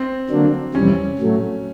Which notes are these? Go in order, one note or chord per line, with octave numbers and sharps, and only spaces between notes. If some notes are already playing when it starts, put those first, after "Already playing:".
Already playing: C4
D3 F#3 A#3 D4
F2 C3 E3 G3 C#4
A2 F#3 A3